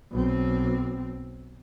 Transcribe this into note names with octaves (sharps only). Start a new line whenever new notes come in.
B1 C4